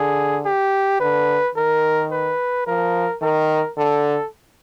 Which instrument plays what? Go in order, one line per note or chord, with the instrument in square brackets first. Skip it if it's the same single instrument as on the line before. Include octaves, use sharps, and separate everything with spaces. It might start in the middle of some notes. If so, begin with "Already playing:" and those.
Already playing: [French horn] D3 [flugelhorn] G#4
[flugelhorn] G4
[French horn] D3 [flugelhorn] B4
[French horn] D#3 [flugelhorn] A#4
[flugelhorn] B4
[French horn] F3 [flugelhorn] A#4
[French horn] D#3 [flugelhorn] A#4
[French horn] D3 [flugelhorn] A4